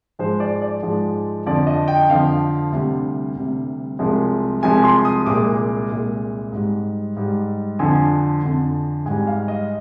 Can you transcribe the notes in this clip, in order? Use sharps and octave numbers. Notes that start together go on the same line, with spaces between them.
G#2 F3 G#3 C5
D5
D5
G#2 F3 G#3
F2 D3 F3 D5
D#5
G5
F2 D3 F3 F5
D2 C3 G3
D2 C3 G3
C2 C3 F3 G#3
C2 C3 F3 G#3 G#5
C6
D#6
C2 A#2 G#3 D6
C2 A#2 G#3
G#2 G3
G#2 G3
F2 D3 F3 G#5
F2 D3 F3
G#2 G3 G#5
F5
D#5